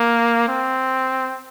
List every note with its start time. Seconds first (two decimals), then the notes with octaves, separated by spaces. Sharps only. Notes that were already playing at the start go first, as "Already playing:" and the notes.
Already playing: A#3
0.48 C4